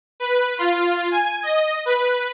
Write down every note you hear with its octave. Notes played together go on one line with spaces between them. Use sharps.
B4
F4
G#5
D#5
B4